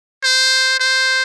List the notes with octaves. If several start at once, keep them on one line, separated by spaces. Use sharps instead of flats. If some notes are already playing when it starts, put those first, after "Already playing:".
C5
C5